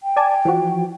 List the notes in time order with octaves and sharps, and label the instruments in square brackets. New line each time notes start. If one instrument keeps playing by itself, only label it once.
[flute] G5
[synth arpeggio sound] D5 G#5 A5
E3 F3 F#4